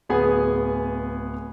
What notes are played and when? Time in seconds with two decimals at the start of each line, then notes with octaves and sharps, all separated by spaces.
0.09 D1 B3 G#4 G#5